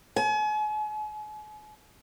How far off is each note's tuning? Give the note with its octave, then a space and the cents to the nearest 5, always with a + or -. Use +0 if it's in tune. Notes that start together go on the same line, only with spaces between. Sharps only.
G#5 +40